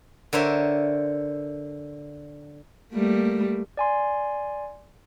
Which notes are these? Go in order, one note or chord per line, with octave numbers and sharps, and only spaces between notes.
D3 A#4 C5 C#5 E5
G3 A3 A#3
D5 G#5 C6